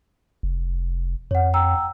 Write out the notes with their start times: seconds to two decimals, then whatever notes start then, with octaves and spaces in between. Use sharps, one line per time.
0.43 F1
1.31 F2 C#5 F#5
1.54 G5 A#5 E6